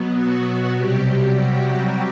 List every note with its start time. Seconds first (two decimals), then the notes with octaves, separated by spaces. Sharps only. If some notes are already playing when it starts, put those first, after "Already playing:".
Already playing: B2 F#3 B3
0.14 F#3 F#4
0.75 C3 F#3 G3 G4
1.05 G3 G4
1.35 F#3 F#4
1.65 F#3 F#4